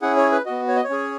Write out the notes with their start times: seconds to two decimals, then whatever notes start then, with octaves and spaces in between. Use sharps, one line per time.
0.02 C#4 E4 G#4 F#5
0.17 C#5
0.32 B4
0.46 B3 F#4 D#5
0.68 C#5
0.76 D#5
0.84 C#5
0.89 C#4 G#4